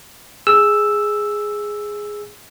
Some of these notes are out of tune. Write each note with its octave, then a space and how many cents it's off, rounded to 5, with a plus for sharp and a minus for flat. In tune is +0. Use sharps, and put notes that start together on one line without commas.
G#4 +0 E6 +0